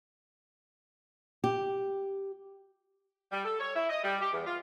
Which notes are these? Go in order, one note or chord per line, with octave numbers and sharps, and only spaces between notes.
G4
G3
A4
C#5
E4
D#5
G3
G4
E2
F4